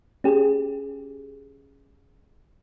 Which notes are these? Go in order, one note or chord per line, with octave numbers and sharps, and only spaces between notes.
C#4 G4 G#4